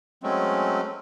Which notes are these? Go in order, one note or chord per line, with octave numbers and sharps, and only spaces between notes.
F#3 G#3 A3 C4 C#4